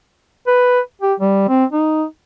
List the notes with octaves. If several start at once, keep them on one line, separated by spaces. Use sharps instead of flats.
B4
G4
G3
C4
D#4